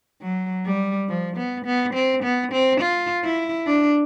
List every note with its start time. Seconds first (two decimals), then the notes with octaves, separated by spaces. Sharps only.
0.22 F#3
0.66 G3
1.08 F3
1.37 B3
1.66 B3
1.94 C4
2.24 B3
2.52 C4
2.81 F4
3.24 E4
3.67 D4